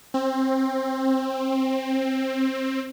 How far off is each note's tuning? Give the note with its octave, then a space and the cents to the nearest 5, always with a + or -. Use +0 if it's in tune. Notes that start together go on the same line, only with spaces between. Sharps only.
C4 +20